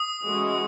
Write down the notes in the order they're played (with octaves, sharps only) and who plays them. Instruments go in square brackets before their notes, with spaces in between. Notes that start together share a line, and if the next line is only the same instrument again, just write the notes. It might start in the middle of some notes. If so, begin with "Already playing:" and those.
Already playing: [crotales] D#6
[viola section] E3 G#3 C#4 F#4